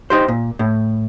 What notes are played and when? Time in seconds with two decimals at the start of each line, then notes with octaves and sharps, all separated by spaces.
0.10 D#4 G4 C5
0.28 A#2
0.59 A2